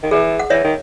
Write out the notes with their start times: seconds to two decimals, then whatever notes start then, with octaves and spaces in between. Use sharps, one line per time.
0.03 D#3
0.11 E3 G#4
0.39 F#5
0.50 E3 C#5 E5
0.64 D#3